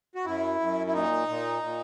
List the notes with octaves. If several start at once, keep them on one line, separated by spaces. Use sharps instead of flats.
F#4
F#2 E4
F#2
E4
A#2 D#4
A#2
A#2